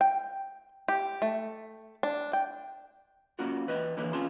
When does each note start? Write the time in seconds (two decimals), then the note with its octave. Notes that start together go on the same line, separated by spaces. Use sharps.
0.01 G5
0.88 G4
1.22 A3
2.03 D4
2.33 G5
3.39 A#3 C#4 F4 F#4 A#4
3.67 E2 B4 D#5 G5
3.97 D3 E3 A#3 E4 A#4 B4
4.13 C4 C#4 F4 G#4 A5 C6